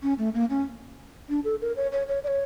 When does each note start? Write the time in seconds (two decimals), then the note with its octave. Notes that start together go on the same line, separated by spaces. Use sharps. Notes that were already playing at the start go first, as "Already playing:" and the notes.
0.03 C#4
0.18 A3
0.34 A#3
0.50 C#4
1.29 D4
1.45 A4
1.61 A#4
1.76 C#5
1.92 C#5
2.08 C#5
2.24 D5
2.28 C#5